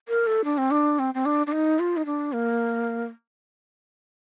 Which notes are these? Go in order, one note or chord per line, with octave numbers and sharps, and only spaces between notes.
A#4
A4
D4
C4
D4
C4
C4
D4
D4
D#4
F4
D#4
D4
A#3